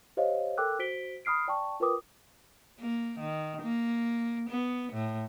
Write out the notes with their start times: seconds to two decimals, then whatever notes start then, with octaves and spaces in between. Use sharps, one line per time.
0.17 G4 C5 C#5 D#5 F5
0.58 A4 A#4 G5 D6 E6 F#6
0.79 F#4 C5 B6 D7 G7
1.25 B5 D#6 F6 C7 D7
1.48 D5 G5 A5 C#6
1.80 F4 A#4 B4 G5 D6 D#6
2.79 A#3
3.19 D#3
3.62 A#3
4.49 B3
4.93 A2